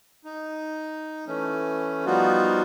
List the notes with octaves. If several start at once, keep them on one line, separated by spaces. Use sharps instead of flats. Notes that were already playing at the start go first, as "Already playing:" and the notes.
D#4
E3 A3 C#4
F3 G3 B3 D#4 F4 F#4